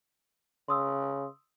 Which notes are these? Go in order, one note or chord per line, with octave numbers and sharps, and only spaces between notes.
C#3 C6 D#6 E6